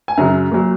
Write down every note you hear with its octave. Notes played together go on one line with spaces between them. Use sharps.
G#5
F#2 C#3 F#3 A#5
A#2 F#3